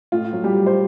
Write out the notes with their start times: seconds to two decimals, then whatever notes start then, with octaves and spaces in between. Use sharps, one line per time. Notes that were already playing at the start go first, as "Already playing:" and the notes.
0.12 A2 F4
0.33 F#3
0.44 G3 G4
0.54 F#3
0.66 C5